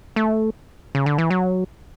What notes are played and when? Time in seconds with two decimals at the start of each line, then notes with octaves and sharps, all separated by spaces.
0.16 A3
0.95 C#3
1.06 D3
1.18 E3
1.30 F#3